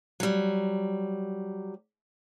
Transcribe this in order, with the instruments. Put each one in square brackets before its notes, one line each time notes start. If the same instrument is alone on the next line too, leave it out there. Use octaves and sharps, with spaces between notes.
[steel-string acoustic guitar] F#3 G3